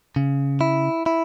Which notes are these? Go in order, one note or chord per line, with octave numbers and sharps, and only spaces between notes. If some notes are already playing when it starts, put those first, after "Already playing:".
C#3
E4
E4